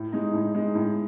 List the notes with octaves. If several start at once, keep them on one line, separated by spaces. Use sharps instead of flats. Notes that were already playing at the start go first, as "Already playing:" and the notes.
Already playing: A2
G#3 D#4
A2
G#3 D#4
A2